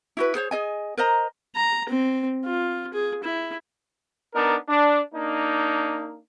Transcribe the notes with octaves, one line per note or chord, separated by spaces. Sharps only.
E4 F#4 B4
G#4 C5 C#5
G#4 D#5 G#5
A#4 C5 D#5 A#5
A#5
C4
F4
G#4
E4
B3 D4 D#4 A#4
D4
A#3 D4 D#4